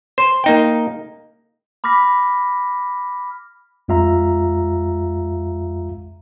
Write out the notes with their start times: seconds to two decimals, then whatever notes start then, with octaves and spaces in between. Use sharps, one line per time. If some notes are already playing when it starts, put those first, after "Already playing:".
0.18 C5
0.44 A#3 D#4 G5
1.84 B5 D6 F6 A#6 B6
3.88 F2 G#3 F4 E5 F5 A#5